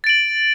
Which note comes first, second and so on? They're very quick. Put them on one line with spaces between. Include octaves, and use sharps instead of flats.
A6 D7 F#7